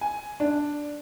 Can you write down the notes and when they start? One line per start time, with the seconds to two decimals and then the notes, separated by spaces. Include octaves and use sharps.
0.01 G#5
0.40 D4